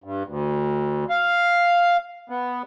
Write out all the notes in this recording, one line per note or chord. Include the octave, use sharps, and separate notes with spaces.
G2
D2
F5
B3